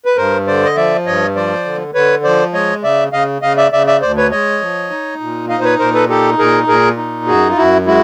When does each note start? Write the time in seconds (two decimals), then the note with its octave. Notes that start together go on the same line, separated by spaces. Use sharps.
0.05 B4
0.16 G2 A#4 C5
0.47 D3 C5 D5
0.65 D#5
0.76 F3 D5 E5
1.06 G2 C#5 D#5
1.35 F3 C5 D5
1.65 D3
1.94 D3 B4 C#5
2.24 F3 C5 D5
2.53 G#3 C#5 D#5
2.83 C#3 D5 E5
3.13 C#3 D#5 F5
3.42 C#3 D#5 F5
3.57 D5 E5
3.72 C#3 D5 E5
3.87 D5 E5
4.02 D2 C5 D5
4.17 B4 C#5
4.31 G#3 C#5 D#5
4.61 F3
4.90 D#4
5.20 A#2
5.49 D#4 D#5 F5
5.59 C5
5.64 B4 C#5
5.79 A#2 A#4 C5
5.94 A4 B4
6.09 D#4 G4 A4
6.38 A#2 G#4 A#4
6.67 A#2 G#4 A#4
6.97 D#4
7.27 F#2 F#4 G#4
7.49 F4
7.56 F#2 E4 F#4
7.86 G#3 E4 F#4